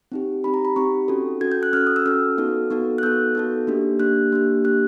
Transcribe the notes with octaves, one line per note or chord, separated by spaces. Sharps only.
C4 D#4 G4
C4 D#4 G4 B5
A#5
B5
C4 D#4 G4 C#6
C#4 F#4 A4
C#4 F#4 A4 G#6
G6
F#6
C#4 F#4 A4 F6
D#6
E6
C#4 F#4 A4 F6
B3 D#4 F#4 A4
B3 D#4 F#4 A4
F#6
B3 D#4 F#4 A4 G6
B3 D#4 F#4 A4
A#3 D4 G4
A#3 D4 G4 F#6
A#3 D4 G4
A#3 D4 G4 F#6